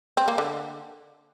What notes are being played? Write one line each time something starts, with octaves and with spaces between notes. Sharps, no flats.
C4
A#3
D3